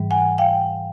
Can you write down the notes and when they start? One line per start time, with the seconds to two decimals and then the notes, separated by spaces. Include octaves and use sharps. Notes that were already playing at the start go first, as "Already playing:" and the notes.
Already playing: G#2 E3 G3
0.11 F#5 G#5
0.38 F5 G5